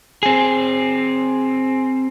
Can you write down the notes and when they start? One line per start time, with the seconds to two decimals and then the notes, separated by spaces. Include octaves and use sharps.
0.23 C4 G#4